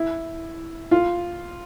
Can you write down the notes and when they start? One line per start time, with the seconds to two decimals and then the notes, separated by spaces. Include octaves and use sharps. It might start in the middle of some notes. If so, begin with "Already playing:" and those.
Already playing: E4
0.91 F4